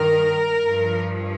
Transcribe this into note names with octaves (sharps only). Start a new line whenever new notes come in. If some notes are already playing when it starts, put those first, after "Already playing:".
Already playing: G2 D#3 A#4
G2 F3